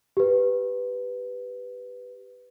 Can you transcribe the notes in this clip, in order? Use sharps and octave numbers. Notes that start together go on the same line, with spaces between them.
G4 B4